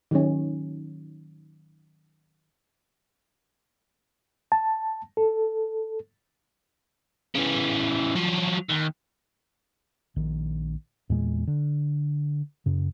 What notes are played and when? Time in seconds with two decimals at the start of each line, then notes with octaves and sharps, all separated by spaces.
0.11 D#3 F#3 C#4
4.52 A5
5.17 A4
7.35 C#3 E3
8.16 F3 F#3
8.70 D#2
10.16 A#1 D#3
11.10 E2 A#2 G#3
11.47 D3
12.66 F#2 C#3